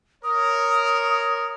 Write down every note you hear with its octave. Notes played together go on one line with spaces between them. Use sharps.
A#4 C#5 D#6